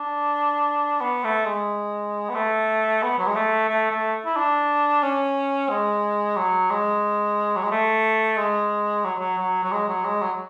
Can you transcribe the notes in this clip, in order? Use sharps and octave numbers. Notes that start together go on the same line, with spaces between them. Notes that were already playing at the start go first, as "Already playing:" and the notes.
Already playing: D4
B3
A3
G#3
B3
A3
B3
F#3
G#3
A3
A3
A3
E4
D4
C#4
G#3
F#3
G#3
F#3
G#3
A3
G#3
F#3
F#3
F#3
F#3
G#3
F#3
G#3
F#3